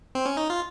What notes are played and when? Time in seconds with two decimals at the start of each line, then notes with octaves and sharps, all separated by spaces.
0.15 C4
0.26 C#4
0.37 D#4
0.50 F4